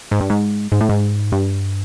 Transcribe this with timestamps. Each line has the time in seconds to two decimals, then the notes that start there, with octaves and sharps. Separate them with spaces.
0.11 G#2
0.20 G2
0.30 G#2
0.72 G#2
0.81 A2
0.89 G#2
1.32 G2